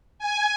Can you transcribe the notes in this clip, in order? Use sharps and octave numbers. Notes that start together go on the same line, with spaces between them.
G#5